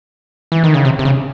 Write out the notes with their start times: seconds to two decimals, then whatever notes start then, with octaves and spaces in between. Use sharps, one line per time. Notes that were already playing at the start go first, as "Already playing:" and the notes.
0.52 E3
0.64 D#3
0.74 C#3
0.85 C3
0.99 C3
1.05 C#3